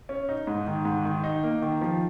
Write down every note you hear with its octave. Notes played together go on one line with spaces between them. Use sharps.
C#4
D#4
G#2
D#3
G#2
D#3
D#4
A#3
D#3
F3